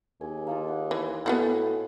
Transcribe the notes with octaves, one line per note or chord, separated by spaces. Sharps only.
D#2 G#4
A#3 D#4 F4
F#5
E3 C6
A2 B3 F4 F#4 G#5